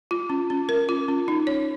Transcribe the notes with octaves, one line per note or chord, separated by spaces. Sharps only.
F4
C#4
C#4
A#4
F4
C#4
D#4
C#5